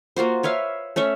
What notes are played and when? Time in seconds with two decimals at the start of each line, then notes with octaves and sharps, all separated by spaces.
0.16 A#3 F4 F#4 C5
0.43 B4 C#5 E5 F5
0.96 A3 C#4 C#5 E5